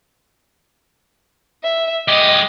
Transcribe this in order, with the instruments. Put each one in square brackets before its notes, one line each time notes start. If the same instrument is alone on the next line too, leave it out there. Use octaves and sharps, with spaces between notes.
[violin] E5
[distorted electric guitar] G#3 G4 [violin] D#5 D#6